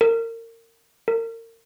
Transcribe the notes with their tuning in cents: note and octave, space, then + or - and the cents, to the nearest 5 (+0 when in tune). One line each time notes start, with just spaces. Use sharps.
A#4 -30
A#4 -35